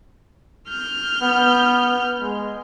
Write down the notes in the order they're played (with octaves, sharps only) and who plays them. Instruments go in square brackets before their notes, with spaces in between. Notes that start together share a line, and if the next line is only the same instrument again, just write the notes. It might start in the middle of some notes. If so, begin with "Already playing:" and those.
[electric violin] F6 G6
[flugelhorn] B3
G#3